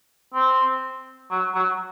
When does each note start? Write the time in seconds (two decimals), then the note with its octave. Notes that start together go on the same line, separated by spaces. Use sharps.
0.34 C4
1.31 F#3
1.55 F#3